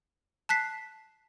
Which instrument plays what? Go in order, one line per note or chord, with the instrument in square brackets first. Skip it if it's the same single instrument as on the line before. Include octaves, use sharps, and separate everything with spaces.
[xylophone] A5 F#6 B6 C7